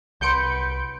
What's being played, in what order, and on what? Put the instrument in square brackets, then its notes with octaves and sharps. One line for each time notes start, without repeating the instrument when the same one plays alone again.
[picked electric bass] C2 [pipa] F#3 C6 [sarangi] B4 [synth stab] G6 C#7 D7